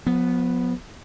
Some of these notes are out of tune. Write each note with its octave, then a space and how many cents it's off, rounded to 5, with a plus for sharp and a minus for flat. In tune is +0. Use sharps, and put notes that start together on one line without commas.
F3 +35 B3 +0